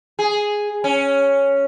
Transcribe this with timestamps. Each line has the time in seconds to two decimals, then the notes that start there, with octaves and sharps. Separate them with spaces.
0.19 G#4
0.84 C#4